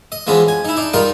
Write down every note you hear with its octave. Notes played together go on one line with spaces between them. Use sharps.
D#5
E3 F3 G#3 B3 C#4
G#5
D#4 E4
D4 D#4
G3 D#4 F4 A#4 D#5